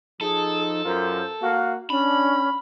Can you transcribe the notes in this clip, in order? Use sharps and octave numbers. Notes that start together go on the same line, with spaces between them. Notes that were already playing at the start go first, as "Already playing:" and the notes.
F3 D#4 G#4 A4
F#2 F4 A#4 C5
A#3 F#4 F5
C#4 D4 B5